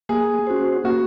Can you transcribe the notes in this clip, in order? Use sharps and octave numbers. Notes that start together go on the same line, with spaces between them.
A#3 G#4
C#4 F#4 C5
A#3 F#4